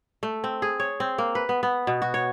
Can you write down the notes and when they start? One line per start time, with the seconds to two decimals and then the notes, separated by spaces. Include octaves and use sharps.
0.23 A3
0.44 C4
0.62 G#4
0.80 C#5
1.00 C4
1.18 A#3
1.35 B4
1.49 B3
1.63 B3
1.87 B2
2.02 F#4
2.14 C#5